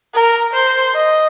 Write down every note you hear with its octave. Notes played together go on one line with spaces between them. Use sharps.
A#4
C5
D#5